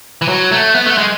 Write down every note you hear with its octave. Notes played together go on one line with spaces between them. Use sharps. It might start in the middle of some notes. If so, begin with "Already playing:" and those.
E3
F#3
A3
B3
A3
G#3